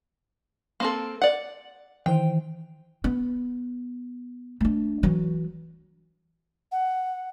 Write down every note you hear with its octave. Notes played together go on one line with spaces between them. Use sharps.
A#3 C4 A4
D5 F#5
D#3 E3 C5 G5
B3
A3 D4
E3 F#3
F#5